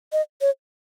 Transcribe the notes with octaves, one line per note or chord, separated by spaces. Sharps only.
D#5
C#5